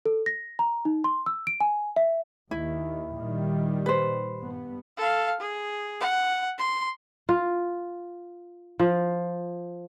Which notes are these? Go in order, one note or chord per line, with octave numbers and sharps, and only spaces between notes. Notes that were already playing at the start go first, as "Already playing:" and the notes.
A4
A#6
A#5
D#4
C6
E6
D7
G#5
E5
D#2 D#3 E4
A#2 D#3 G3
B4 C5
G2 B3
A4 F5
G#4
F#5
C6
F4
F3